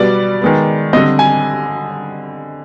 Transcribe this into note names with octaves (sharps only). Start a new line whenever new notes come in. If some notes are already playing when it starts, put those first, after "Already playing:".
Already playing: B2 G3 B3 D5
D#3 G#3 B3
D3 G3 C4 D#5
G#5